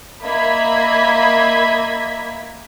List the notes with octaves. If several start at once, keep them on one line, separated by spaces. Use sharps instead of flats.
A#3 D#5 E5 B5 G#6 B6